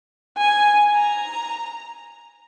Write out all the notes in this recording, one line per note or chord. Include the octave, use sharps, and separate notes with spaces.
G#5
A#5